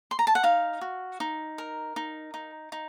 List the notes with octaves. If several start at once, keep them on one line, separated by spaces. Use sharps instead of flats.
C6
A#5
A5
F#5
D#4 F5
F#4
D#4
A#4
D#4
D#4
D#4